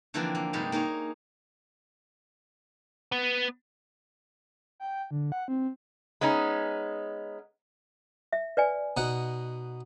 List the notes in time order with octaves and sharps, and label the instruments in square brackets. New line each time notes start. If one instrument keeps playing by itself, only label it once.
[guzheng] D3 E3 F3 A#3 C4 D4
A#3
G2 C3 G3 G#3 D#4
A#3 D#4 G#4 C#5
[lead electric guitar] B3
[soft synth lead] G5
D3
F#5
C4
[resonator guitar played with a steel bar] G#3 B3 C#4 D#4
[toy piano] E5
B4 D5 G#5
[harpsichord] B2 D#4 F#5